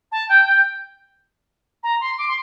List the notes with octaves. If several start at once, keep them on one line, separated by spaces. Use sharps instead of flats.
A5
G5
G5
A#5
C6
D6
C6